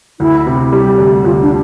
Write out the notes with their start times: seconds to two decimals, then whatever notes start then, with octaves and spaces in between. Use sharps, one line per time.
0.20 D2 E4
0.46 C3
0.73 G3 G4
0.98 D2
1.25 D2 F4
1.42 D4